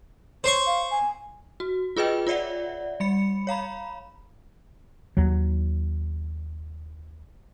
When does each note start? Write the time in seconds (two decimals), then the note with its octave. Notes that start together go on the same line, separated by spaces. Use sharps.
0.44 C5 C#5 C6 C#6
0.66 F5
0.91 G#5
1.60 F#4
1.97 F4 G#4 B4 D#5 G5
2.27 F4 C#5 D5 E5 F#5
3.00 G3 B5 C#7
3.47 C#5 F5 A#5 B5
5.17 D#2 F#3